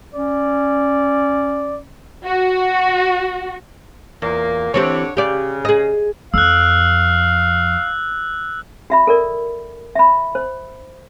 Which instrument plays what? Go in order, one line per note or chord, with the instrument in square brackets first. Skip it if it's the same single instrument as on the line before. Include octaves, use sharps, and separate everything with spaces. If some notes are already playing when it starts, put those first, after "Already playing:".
[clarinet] C#4 [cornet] D5
[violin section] F#4
[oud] E2 [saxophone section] A#2 A#3
[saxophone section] D3 C#5 [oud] E3 C4 G4
[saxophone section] C#3 [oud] G4 D5
[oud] G#4 D#5
[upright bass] F2 [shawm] F5 [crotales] E6 F#6
[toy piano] F#4 E5 B5
A4 A#4 D5
E5 B5
C5